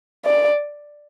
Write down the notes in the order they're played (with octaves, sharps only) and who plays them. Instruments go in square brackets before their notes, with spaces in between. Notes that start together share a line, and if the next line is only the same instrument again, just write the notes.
[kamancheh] D5